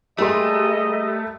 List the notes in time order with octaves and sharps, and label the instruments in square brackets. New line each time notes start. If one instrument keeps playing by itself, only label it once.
[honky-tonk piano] G3 A#3 C6 [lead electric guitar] A3 [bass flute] G#4 [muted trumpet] D#5